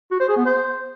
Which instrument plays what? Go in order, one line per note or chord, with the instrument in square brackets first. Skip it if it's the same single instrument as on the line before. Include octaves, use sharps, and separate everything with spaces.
[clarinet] F#4
C5
G#4
B3
C5